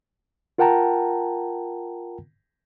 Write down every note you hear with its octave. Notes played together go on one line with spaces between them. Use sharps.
F4 A#4 F#5 G5 A5 A#5